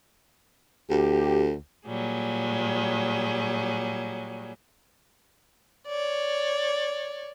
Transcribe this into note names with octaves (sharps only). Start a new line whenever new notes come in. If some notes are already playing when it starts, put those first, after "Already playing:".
D2 G4
A#2 F#3 G3 G#4
C#5 D5